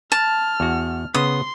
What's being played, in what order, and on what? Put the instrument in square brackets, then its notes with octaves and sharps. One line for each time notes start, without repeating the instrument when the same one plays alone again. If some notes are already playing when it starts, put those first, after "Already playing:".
[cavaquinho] A5 [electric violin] F6
[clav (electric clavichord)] E2 F#4
[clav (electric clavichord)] C#3 B3 [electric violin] C6 [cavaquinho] D#6